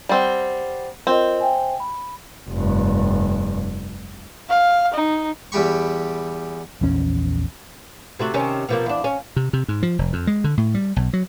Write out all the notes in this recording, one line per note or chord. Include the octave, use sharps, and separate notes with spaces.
G3 C4 F#5 A6 C7
C4 F4 A#4 D#5
E5 G5 G#5
B5
F1 G2
F5
D#4
E2 G3 G4 B5 C#6
A#1 E2 C#4
C3 A3 F#4
C3 D#3 C#4
B2 F3 A#3
E2 D4
C#4
C3
C3
G#2
F3
F1
F2
G#3
D3
A2
G3
B1
F#3